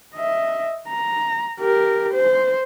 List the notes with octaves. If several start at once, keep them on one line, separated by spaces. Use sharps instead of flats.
D#5 E5
A#5
G4 A#4
C5